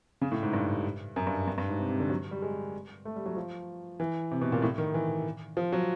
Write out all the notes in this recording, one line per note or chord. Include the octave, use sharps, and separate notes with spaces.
C#3
A2
G#2
G2
F#2
G2
G2
G2
G#2
C3
C3
D3
F#3
G3
G#3
A3
G3
F#3
F3
E3
C3
B2
A#2
A2
D#3
E3
F3
F#3